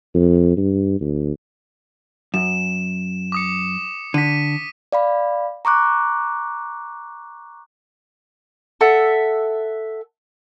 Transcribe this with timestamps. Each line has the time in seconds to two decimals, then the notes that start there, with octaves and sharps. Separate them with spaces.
0.14 F2
0.57 G2
1.00 D2
2.34 F#2 E7
3.32 D6 D#6 C#7
4.14 D3 B6 D#7
4.92 D5 F5 B5
5.65 A#5 C#6 D6 F#6
8.81 A4 E5 F#5